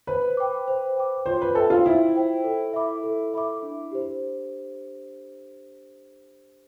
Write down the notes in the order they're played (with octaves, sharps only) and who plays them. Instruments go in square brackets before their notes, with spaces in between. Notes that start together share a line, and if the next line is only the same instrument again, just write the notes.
[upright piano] B4 [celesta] C5
[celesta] G5 D6
C5
G5 D6
[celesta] F4 [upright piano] C5
[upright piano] B4
[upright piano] A4 [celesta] C5 E5 G5
[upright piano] F4
[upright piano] E4 [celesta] F4
[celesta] C5 E5 G5
A4
E5 B5 D6
A4
E5 B5 D6
D4
G4 C5